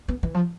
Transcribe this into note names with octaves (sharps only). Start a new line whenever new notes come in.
B3
E3
F3